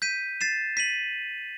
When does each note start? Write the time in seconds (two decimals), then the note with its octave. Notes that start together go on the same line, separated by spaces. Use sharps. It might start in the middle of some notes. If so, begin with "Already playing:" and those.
0.02 G6 B6 D#7
0.41 A6 C7 E7
0.77 B6 D#7 F#7